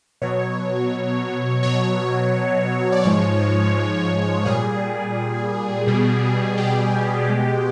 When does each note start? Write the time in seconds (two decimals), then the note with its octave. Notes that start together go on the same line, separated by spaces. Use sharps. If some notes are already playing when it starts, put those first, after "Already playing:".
0.22 B2 F#3 C#5
1.63 B2 F#3 C#5
2.92 D5
3.03 G#2 F3 G#3 C#5
4.45 A#2 G3 G#4
5.87 B2 G3
6.58 G4
7.29 B2 G#3